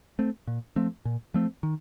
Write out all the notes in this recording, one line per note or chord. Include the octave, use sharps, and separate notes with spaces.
A3 C4
A#2
F3 A3 C4
A#2
F3 A3 C4
D#3